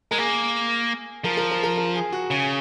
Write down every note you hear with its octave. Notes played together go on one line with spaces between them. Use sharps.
G#3 A#4
A#3 G#4
F3 A#4
A#4
A#4
A#4
A#4
G#4
F#4
C#3 G#4